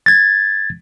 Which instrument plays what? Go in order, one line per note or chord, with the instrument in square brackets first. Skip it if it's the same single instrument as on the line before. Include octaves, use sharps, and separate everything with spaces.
[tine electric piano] G#6 A6